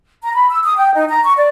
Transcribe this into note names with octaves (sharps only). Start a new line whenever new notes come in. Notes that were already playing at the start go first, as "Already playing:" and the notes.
A#5
B5
E6
D#6
G5
D#4
A#5
C#6
D5